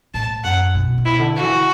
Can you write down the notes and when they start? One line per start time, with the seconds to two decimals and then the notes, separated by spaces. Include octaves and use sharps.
0.14 A2 A5
0.44 F#2 F#5
0.75 B2
0.98 B2
1.05 E4
1.19 D3
1.36 F#4
1.43 E3